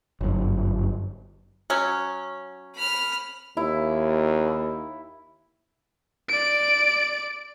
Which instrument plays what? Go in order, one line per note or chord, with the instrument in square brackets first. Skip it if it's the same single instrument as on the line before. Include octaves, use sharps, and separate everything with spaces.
[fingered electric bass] G1 F#2
[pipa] F#3 C#4
[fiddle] B5 F6
[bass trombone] D#2 [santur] E4
[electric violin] D5 D7